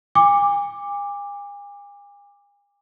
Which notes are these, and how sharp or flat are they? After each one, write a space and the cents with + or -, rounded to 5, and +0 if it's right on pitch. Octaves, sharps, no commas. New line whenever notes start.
G#5 -40 D6 +0